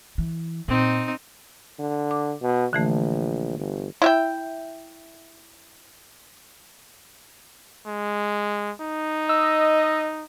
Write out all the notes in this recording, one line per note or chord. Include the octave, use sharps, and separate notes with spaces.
E3
A#2 C4 D#4
D3
D6
B2
A#1 D3 E3 A3
G1
E4 E5 G5
G#3
D#4
D#5 E6